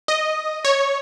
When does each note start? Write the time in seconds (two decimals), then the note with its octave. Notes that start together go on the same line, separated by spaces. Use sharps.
0.08 D#5
0.65 C#5